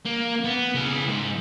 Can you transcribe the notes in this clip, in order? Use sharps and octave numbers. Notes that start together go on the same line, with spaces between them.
A#3
B3
C#3 E4
G#2